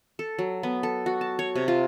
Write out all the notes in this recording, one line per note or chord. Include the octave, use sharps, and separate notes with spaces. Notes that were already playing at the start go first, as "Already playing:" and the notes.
A4
F#3
B3
A4
F#4
A5
C#5
C3
F4